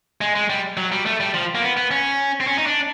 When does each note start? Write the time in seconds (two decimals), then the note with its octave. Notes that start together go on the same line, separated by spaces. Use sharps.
0.21 G#3
0.35 G#3
0.50 G3
0.77 F#3
0.92 G3
1.06 A3
1.20 G3
1.34 F3
1.55 A#3
1.62 B3
1.77 B3
1.91 C#4
2.40 C4
2.47 C#4
2.58 D#4
2.66 D4